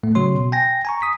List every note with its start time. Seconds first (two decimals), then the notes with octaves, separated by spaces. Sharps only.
0.03 A2 A3
0.15 C#3 F#3 F#4 C#5 C6
0.35 B2
0.52 G5 G#5 A#6
0.85 G#5 A#5 C#6
1.02 D#6 B6